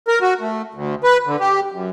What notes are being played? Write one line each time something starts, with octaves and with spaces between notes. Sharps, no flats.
A#4
F#4
A3
D2
B4
D3
G4
F#2